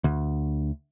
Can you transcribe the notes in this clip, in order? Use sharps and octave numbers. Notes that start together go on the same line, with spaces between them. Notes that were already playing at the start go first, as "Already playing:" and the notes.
D2